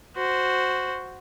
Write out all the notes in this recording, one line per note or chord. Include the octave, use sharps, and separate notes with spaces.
F#4 C5